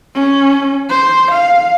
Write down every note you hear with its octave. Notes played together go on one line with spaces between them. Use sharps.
C#4
C5
F5